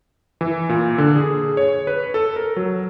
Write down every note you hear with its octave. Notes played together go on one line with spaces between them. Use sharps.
E3
A#2
D3
G#4
C#5
B4
A4
A#4
F#3